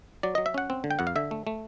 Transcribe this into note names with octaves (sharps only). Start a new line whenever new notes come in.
F#3 D5
F#3 D#5
E5
C#4 F#5
C4
D3
G5
F2 F#5
F5
D3 E5
A3
A3